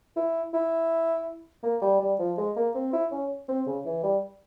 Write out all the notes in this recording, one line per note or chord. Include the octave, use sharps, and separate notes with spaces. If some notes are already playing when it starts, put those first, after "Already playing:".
E4
E4
A#3
G3
G3
F3
G#3
A#3
C4
E4
C#4
C4
C#3
E3
G3